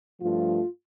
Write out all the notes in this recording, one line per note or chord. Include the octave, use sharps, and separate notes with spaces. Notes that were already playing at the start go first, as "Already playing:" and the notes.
G2 F3 A3 F4